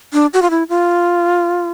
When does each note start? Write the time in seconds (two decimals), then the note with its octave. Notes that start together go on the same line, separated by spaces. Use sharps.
0.13 D4
0.34 F#4
0.42 F4
0.50 E4
0.69 F4